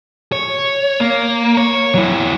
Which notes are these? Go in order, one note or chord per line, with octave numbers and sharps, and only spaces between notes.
C#5
A#3
C#5
F#3 E4